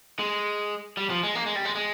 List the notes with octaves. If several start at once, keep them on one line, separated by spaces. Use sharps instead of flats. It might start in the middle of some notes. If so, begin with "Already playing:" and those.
G#3
G3
F3
G#3
A#3
G#3
G3
G#3
G#3